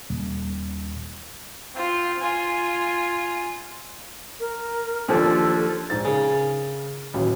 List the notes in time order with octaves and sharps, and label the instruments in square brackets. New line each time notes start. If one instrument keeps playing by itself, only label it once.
[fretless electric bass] D#1
[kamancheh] C4 F4
F4 G#5
[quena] A#4
[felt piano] D#2 F3 D4 [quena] A4
[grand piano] A#1 G#2 A6
[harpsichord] C#3 [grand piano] G#4 A#4
[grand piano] A1 D#2 F#3